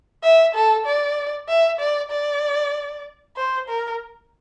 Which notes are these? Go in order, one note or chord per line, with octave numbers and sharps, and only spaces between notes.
E5
A4
D5
E5
D5
D5
C5
A#4